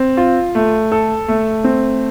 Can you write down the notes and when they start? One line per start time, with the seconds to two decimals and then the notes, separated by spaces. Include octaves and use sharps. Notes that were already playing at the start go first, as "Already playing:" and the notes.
Already playing: C4
0.17 F4
0.55 A3
0.92 A4
1.28 A3
1.64 C4